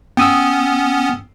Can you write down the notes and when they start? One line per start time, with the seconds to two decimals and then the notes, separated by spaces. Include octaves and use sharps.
0.17 B3 C#4 G5 D#6 E6